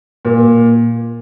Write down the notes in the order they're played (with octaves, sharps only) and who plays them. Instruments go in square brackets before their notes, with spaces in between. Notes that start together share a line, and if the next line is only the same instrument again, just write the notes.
[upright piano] A#2